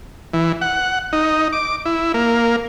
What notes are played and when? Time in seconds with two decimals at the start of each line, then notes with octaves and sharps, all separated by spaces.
0.33 E3
0.61 F#5
1.13 D#4
1.53 D6
1.85 E4
2.14 A#3